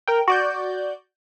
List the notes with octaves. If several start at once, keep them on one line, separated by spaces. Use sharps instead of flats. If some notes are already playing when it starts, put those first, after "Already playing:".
A#4 G5
F#4 D5 G6